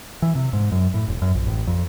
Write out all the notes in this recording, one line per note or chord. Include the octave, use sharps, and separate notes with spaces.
E3
C3
G#2
F#2
A2
E1
F#2
A#1
A1
F2